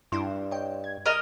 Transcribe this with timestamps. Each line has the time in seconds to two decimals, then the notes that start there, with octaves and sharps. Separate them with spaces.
0.12 G2 D4 E4 C6
0.51 C#5 D#5 G5
0.84 G#6
1.06 A#4 D#5 F6